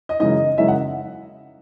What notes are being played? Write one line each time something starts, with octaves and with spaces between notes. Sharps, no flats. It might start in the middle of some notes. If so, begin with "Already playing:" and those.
D#5
F#2 C#3 E3 G#3 D#4 D#5
F#2 C#3 E3 G#3 D#4 E5
F#5